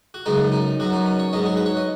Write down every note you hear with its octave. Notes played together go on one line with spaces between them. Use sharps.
F#4
F#2 C#3 G#3 B3 D#4
D#4
F#2 F#3 B3 F#4
D#4
C#4
C#5
G#2 F#3 B3 D#5
G#4
B4
C#5
D#5